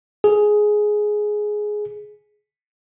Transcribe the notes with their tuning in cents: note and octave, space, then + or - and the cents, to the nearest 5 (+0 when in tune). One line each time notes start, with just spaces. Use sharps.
G#4 +10